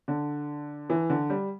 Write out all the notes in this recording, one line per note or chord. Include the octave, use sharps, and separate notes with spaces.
D3
E3
D3
G3